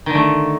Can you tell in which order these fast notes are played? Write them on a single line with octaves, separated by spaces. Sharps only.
D#3 D3 A3